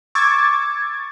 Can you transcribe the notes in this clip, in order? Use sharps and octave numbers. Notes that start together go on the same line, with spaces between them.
C#6 D6 E6 G#6 A6